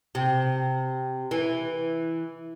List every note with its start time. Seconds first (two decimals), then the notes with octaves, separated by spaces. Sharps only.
0.15 C3
1.31 E3